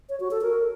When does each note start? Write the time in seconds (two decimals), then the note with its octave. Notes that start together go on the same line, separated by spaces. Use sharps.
0.09 C#5
0.20 F#4
0.31 A4
0.42 A#4